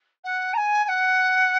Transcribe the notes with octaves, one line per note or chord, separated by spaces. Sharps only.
F#5
A#5
G#5
G#5
F#5